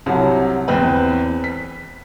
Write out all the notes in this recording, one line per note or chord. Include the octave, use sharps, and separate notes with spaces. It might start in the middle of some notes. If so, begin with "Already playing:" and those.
C2 C3 F#3
E2 C4 B4
B6